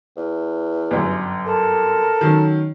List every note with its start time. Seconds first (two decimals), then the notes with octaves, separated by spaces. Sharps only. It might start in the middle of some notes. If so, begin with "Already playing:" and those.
0.17 E2
0.91 G1 F#2
1.46 A4 A#4
2.21 D#3 F#3 C#4